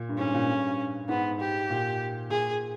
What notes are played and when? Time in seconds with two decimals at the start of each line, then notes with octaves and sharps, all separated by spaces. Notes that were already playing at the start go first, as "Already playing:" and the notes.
Already playing: A#2
0.09 G2
0.18 G#2 C#4
0.34 A#2
0.49 G2
1.09 G#2 B3
1.40 G4
1.70 A#2
2.30 A#2 G#4